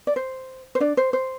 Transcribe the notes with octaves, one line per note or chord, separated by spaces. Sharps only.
D5
C5
C5
D4 D5
C5
C5